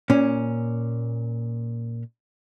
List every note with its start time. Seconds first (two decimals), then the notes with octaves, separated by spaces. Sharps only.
0.10 A#2 C#4